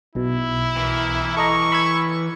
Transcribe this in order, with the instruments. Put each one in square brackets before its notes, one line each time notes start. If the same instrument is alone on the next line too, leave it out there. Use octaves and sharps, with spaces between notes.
[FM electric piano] B1 B2 [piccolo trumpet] E4
[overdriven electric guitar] E3 A#4
[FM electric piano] A4 D#5 A#5 [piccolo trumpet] C#6
[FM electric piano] B5 E6 G#6